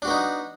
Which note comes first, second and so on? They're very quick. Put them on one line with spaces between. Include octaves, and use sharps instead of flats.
D4 F#4 B3 D#4